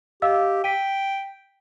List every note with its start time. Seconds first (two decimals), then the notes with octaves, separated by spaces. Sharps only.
0.22 G4 D#5 F5 E6
0.64 G5 B6 D#7